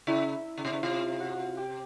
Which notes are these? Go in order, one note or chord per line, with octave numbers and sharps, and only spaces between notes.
C#3 E4 E5
C#3
C3
C#3
C3 F4 F5
F#4 F#5
G4 G5